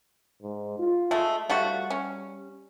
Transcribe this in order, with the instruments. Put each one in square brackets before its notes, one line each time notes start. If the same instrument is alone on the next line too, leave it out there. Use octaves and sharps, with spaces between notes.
[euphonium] G#2
F4
[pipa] G#3 A3
[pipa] F3 A3 F#4 [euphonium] G3
[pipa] C#4